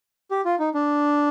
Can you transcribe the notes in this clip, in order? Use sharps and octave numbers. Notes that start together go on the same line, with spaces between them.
G4
F4
D#4
D4